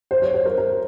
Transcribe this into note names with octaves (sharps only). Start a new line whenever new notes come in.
C5
C#5
C5
A#4
A#4